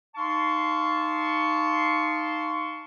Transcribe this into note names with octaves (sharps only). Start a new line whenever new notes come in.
D#4 F5 A5 C6 C#6